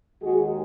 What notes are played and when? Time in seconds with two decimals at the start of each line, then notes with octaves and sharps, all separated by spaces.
0.21 D#2 D#3 G#3 F#4 G#4